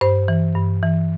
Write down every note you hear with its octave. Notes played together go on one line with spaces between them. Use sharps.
G2 C5
E3
G2
E3